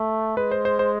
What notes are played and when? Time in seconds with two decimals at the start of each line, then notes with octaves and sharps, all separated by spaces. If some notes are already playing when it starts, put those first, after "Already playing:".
Already playing: A3
0.37 G#3 B4
0.52 C5
0.65 C5
0.79 C5